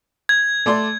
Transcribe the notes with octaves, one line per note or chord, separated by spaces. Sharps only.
G#6
A3 D5 C6